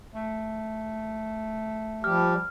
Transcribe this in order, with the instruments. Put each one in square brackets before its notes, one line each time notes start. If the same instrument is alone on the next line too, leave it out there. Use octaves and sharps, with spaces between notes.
[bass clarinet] A3
[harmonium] F3 G3 G4 [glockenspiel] F6